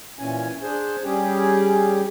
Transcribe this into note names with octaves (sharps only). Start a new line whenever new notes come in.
A#2 E3 C#4 G#5
D4 G#4 C5
G3 C#4 G4 G#4